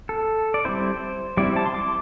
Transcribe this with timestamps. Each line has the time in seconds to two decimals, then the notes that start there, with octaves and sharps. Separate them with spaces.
0.09 A4
0.54 D5
0.65 G3 C4 E4 C5
1.37 G3 C4 E4 D5
1.56 A5
1.66 C6
1.74 D6